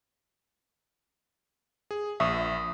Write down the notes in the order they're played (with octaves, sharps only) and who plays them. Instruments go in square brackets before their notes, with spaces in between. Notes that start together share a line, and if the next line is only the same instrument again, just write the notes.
[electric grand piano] G#4
[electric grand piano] A#1 [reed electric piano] E5 C#6 D#6